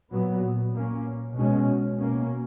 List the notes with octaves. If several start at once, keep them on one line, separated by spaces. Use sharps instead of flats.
A#2 F#3 B3
A#2 A#3 C#4
B2 G#3 C#4
B2 A#3 C#4